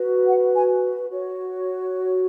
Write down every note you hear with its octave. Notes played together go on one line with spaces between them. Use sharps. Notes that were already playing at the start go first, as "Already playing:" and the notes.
Already playing: F#4 B4
F#5
G#5
F#4 C#5